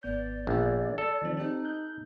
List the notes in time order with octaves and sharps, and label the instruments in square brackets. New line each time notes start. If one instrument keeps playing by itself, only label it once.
[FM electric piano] G#1 B3 G6 [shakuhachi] D5
[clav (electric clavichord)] A#1
A4
[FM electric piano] D#3 F3 C4
[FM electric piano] C4 G4 [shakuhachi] D#4
[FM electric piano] F#6 G6